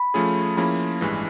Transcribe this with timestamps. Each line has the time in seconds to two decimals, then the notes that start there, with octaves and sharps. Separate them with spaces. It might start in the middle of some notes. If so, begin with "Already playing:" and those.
Already playing: B5
0.14 F3 A3 C#4 F4 G#4
0.57 F3 A#3 C#4 E4 G#4 B5
1.01 A1 G2 E3 G#3